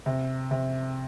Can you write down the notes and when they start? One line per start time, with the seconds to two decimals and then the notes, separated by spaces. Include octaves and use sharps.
0.06 C3
0.51 C3